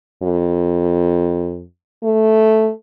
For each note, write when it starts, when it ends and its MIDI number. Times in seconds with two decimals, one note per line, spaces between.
0.23 1.65 41
2.03 2.70 57